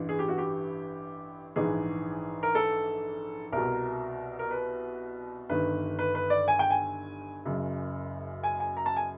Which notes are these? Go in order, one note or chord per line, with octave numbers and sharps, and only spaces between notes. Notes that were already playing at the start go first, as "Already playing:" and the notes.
Already playing: A1 G2 E3
G#4
G4
F#4
G4
A#1 G#2 E3 G#4
A#4
A4
C2 B2 A#4
A#4
B4
G1 G2 D#3 B4
B4
B4
D5
G#5
G5
G#5
F#1 F#2 C#3
G#5
G#5
A#5
A5
G#5